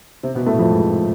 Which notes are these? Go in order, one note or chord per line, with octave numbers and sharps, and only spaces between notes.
C3 C4
B2 B3
A2 A3
F2 F3
G#2 G#3